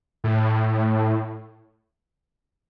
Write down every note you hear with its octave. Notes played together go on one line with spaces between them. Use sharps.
A2